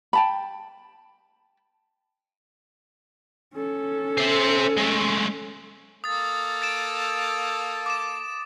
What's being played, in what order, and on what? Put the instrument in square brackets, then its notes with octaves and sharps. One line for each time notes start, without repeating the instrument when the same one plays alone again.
[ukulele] G5 A5 B5
[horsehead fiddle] C#4 A4
[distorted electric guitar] C5 E5
G#3 A3
[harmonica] A#3 A4 [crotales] D#6 A6
[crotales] A6 D7 E7
D6 E7